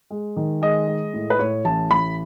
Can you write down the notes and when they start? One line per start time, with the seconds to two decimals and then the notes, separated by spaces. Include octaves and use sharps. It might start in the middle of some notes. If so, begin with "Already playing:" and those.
0.10 G#3
0.36 D#3
0.62 G#3 D#5
0.88 G#3
1.13 A2
1.30 B4
1.39 A2 C#5
1.65 A1 A5
1.91 A1 B5